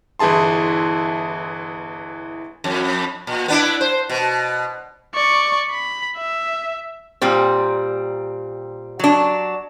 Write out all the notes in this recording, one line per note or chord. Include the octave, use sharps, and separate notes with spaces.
G1 E3 E4 G#4 A5 C6
F2
A#2
B3 D4 E4
C5
B2
D5 C#6
B5
E5
A#2 G3 C4
F#3 D4